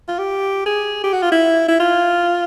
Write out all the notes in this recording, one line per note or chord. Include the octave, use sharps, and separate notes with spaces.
F4
G4
G#4
G4
F#4
F4
E4
E4
F4